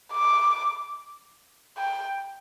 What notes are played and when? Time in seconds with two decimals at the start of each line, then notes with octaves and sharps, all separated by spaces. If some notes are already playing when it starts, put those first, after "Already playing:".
0.13 D6
1.78 G5